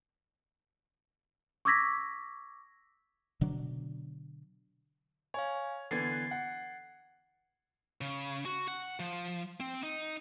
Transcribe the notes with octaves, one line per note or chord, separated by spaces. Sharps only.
C#6 D6 E6 G#6 A#6 B6
B2 D3 F#3 D4
C#5 F5 G#5
D3 E3 B3 G#6 A6 C7
F#5
C#3
F#4
F#5
F3
C4
D#4